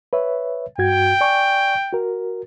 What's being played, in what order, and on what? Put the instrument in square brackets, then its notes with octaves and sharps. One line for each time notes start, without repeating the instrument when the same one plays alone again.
[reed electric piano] B4 C#5 E5
[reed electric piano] G2 F#4 G#6 [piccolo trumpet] G5
[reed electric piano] D5 G#5 C#6
F#4 A#4